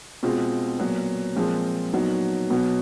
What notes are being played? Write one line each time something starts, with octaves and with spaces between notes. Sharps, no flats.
B2 G#3 C4 F4
A#2 F#3 B3
A#2 F3 G#3 C4 F4
A#2 F#3 B3 D#4 F#4
B2 F#3 B3